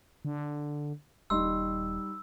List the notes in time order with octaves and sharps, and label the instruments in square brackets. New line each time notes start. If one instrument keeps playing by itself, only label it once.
[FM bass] D3
[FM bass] D#1 [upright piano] G3 D#4 C6 [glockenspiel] E6